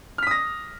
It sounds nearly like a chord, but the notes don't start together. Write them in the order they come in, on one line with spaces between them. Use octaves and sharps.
F6 B6 D#6 A#6